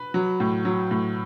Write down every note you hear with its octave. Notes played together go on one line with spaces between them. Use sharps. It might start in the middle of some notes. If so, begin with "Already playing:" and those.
Already playing: B4
F#3
A2
F#3
A2